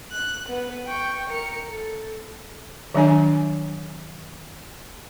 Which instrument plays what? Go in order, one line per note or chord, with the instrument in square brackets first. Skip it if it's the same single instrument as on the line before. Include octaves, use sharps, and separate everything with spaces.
[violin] F#6
B3 B4
G5 C#6
A#4 C#7
A4
[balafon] D#3 F#3 D4 G#5